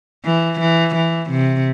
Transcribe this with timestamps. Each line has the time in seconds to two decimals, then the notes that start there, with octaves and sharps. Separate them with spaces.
0.25 E3
0.60 E3
0.95 E3
1.30 C3